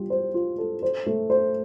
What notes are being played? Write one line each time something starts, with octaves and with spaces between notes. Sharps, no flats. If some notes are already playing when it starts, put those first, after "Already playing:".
Already playing: G3 F4
C5
F4
A4
C5
A3
C5